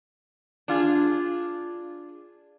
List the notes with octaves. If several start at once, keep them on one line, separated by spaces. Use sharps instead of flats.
D4 F4 G#4